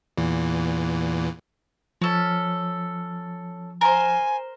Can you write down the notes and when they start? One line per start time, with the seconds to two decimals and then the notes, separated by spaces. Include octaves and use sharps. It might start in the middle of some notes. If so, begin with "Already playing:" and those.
0.18 E2 A#2 E3
2.02 F3 C#4 A4
3.81 A#4 C5 G#5